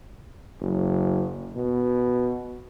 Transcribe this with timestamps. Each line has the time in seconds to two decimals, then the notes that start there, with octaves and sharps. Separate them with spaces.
0.60 F#1
1.56 B2